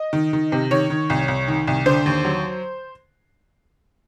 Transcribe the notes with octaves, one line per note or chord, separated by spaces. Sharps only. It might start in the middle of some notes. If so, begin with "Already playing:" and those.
Already playing: D#5
D#3
D#3
C3
D#3 C#5
D#3
C2
C2
D#3
C2
D3 C5
D#2
F#3